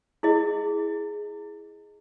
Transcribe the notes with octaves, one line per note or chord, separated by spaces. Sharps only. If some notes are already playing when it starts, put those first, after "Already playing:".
E4 G#4 D#5